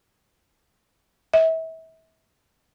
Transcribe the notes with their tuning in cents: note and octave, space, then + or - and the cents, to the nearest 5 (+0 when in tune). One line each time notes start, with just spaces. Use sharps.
E5 -35